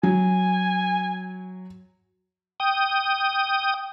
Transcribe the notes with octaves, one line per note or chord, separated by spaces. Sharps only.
F#3 G#5
G5 D#6